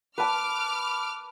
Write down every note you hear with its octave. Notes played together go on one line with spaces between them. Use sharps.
B4 A5 D6 F6